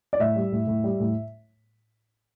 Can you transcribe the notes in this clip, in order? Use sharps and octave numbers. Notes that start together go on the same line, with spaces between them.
D5
A2 E5
G3
A2
A2
G3
A2